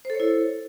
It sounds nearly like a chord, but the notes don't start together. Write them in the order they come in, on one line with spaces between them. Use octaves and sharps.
C5 A4 C#5 E4